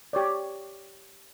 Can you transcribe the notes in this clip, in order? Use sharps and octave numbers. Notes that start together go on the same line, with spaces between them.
G4 C#5 D5